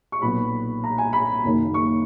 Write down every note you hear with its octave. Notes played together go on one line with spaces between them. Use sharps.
C#6
B1 A#2 F#3 B3 B5
A#5
G#5
B5
F#1 F#2 D#3 A#3
C#6